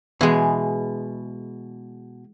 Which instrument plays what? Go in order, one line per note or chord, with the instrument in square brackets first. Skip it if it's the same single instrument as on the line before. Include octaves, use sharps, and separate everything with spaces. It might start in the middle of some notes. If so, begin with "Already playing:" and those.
[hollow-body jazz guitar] B2 G#4 [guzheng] E3 G#3